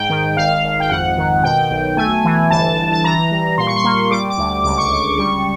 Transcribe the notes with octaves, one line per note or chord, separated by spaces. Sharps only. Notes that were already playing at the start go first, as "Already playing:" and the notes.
Already playing: G#2 G5
D#3
G#1 F5
G#1
G5
F2 F#5
D#3
B2 G5
B1
A3 G#5
E3
G1 A5
G1
A5
E3 A#5
G3
A#2 C6
C#6
C6
A#3
G3 D6
D6
D2
C#2 D6
C#6
C#2 D6
G3 C#6